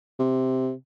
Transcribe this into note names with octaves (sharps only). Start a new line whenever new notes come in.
C3